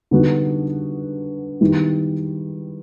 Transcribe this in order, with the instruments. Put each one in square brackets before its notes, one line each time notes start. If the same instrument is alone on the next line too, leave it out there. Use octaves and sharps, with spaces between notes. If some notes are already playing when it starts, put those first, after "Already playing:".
[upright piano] D3 G3 B3 D#4 F#4
D#3 G3 B3 E4